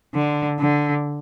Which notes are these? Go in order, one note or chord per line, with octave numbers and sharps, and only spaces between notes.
D3
D3